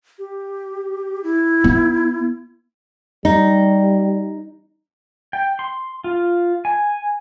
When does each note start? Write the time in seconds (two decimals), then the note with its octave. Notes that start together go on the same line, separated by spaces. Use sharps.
0.19 G4
1.24 E4
1.64 B3
3.25 G3 D#4
5.33 G5
5.59 C6
6.04 F4
6.65 G#5